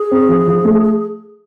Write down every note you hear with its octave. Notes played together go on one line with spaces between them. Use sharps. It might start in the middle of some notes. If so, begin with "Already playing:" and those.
Already playing: G#4
C4
F3
F3
A3